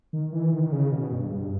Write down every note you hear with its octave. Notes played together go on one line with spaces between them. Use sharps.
D#3
E3
D#3
D#3
C#3
B2
G2
G2